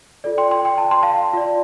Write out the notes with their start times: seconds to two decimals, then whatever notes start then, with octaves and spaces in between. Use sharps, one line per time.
0.24 F4 A4 D5
0.38 G5 C6
0.51 G5 C6
0.65 G5 C6
0.78 A5
0.91 C6
1.03 F5 A5
1.33 F4 D5